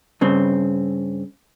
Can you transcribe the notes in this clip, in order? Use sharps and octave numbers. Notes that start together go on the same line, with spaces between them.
G2 C#3 C4